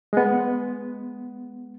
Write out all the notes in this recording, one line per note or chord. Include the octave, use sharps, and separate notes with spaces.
G#3 B3